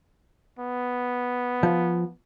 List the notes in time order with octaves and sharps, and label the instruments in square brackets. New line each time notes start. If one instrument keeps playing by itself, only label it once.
[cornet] B3
[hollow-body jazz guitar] F3